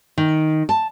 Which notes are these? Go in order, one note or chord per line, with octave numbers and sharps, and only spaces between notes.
D#3
A5